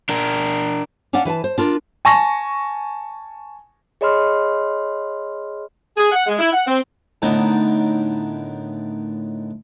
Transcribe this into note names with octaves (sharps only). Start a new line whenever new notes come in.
D4 A#4
C#4 D4 D5 F5 F#5
E3 B4 G5 A5
C5
D4 F4 A#4
G#5 A5 C#6 A#6
G#4 C#5 D#5 B5 C6 F6
G#4
F#5
G#3
E4
F#5
C4
A2 D3 D#3 B3 D#4